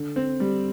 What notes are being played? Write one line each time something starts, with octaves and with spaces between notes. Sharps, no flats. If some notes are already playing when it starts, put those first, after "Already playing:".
Already playing: D3
C4
G3